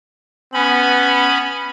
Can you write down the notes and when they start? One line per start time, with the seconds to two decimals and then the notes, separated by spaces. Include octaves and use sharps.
0.53 B3 C#4 B5